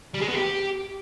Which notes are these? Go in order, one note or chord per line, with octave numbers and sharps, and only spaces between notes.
G3
G#3
B3
G4